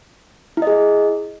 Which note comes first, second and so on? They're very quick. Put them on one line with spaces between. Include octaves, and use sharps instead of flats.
E4 D#5 G#4